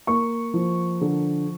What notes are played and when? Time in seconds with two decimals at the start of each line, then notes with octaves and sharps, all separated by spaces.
0.07 A#3 C#6
0.54 F3
1.01 D3